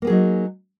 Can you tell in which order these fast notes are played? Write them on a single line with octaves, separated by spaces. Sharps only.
A#3 B3 G#4 F#3 D#4